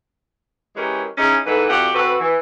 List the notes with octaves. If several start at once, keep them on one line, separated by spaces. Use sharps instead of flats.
E3 G#3 C#4 G4 A#4
C#4 D#4 E4 G#4
G#2 D#3 E3 A4 B4
F2 F#4 G4 F#5
C4 F#4 A4 B4
E3